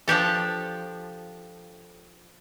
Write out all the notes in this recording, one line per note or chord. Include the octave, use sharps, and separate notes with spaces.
F3 D4 G4 A4